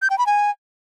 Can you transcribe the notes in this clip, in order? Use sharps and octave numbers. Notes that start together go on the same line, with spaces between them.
G6
G5
B5
G#5